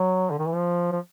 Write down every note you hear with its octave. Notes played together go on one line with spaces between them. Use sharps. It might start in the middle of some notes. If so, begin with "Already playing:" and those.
Already playing: F#3
D3
D#3
E3
F3
F3